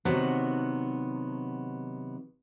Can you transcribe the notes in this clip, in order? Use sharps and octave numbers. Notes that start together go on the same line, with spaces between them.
C3 D#3 F#3 B3 F#5